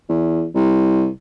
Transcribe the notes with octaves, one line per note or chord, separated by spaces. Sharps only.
E2
C2